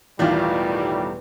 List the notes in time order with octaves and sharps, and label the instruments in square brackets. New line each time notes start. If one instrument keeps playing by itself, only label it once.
[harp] E1 F5 [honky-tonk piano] E2 D#3 [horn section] A2 G3 [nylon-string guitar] E4 F4